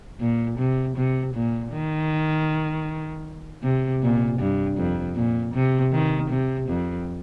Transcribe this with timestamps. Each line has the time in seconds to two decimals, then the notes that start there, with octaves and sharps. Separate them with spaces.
0.20 A#2
0.58 C3
0.96 C3
1.34 A#2
1.72 D#3
3.63 C3
4.02 A#2
4.40 G2
4.77 F2
5.16 A#2
5.54 C3
5.92 D#3
6.30 C3
6.68 F2